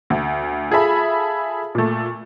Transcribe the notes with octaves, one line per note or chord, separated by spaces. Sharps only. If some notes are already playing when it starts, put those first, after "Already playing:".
D2
F4 G#4 A4 E5 B5
A#2 A3